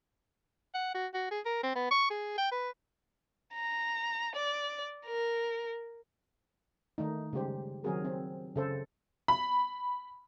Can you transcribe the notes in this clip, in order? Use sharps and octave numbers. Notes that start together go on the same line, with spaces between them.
F#5
F#4
F#4
G#4
A#4
C4
B3
C#6
G#4
G5
B4
A#5
D5
A#4
D#3 A3 D#4
C#3 G3 G#3 G4 C5
D#3 F#3 C4 F#4 G#4 A#4
C4
C#3 A4 C5
B5